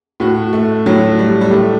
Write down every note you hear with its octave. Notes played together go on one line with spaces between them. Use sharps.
A2 F#4
A3
A2 F#3
G3
G3
A2 A3